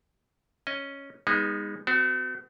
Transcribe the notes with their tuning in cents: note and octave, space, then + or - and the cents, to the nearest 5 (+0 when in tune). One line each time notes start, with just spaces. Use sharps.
C#4 +0 D#5 +0
G#3 -30 B3 -10 D#4 +0
C4 -45 F#4 +10